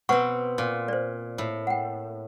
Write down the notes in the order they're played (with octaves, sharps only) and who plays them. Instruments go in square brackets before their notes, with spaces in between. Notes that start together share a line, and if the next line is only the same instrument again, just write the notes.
[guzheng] B2 C4 [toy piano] C5 F#5 C#6
[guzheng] A#2
[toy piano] C5 D5
[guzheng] A2
[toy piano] F#5 G5